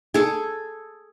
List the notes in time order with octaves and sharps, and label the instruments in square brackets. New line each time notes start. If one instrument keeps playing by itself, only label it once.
[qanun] G#4 A4